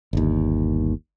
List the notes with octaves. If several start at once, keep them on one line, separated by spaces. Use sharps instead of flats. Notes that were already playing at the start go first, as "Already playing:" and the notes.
G1 D#2